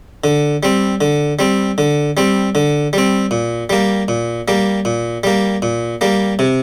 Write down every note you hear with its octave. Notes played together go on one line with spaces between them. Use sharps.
D3
G3 C4
D3
G3 C4
D3
G3 C4
D3
G3 C4
A#2
G3 A#3
A#2
G3 A#3
A#2
G3 A#3
A#2
G3 A#3
C3